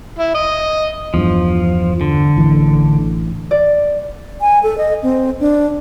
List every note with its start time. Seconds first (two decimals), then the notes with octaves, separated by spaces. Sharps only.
0.19 E4
0.35 D#5
1.14 E2 G2 F3
2.01 D3
2.37 A1 E3
3.51 D5
4.41 G#5
4.63 A4
4.78 D#5
5.03 C4
5.40 D4